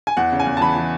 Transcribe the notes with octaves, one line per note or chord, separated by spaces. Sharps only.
G#5
E2 F#5
C#3
G#5
E2
A5
E3 B5
E3